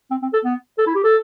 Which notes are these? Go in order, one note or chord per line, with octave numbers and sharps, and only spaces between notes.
C4
C4
A4
B3
A4
E4
G4
A4